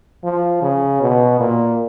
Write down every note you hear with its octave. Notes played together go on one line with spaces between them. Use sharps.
F3
C#3
B2
A#2